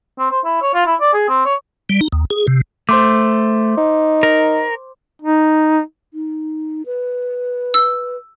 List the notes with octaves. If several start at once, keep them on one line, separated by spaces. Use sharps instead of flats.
C4
C5
E4
C#5
F4
E4
D5
G#4
C4
C#5
G3
D#4
D#2
G#4
C3
A3 C5 C6 D6
D#4
A#4
D#4
D#4
B4
E6